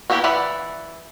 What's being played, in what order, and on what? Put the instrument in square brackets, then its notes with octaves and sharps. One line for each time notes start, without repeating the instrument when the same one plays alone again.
[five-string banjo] A#3 B3 E4 G4
E3 B4 D5 E5 F#5